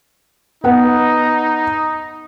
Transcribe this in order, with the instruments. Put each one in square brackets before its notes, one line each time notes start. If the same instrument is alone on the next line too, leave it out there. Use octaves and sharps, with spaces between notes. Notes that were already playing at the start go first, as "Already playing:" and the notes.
[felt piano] B3 F#5 [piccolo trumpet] D#4